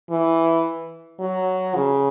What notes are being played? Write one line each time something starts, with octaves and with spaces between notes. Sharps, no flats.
E3
F#3
C#3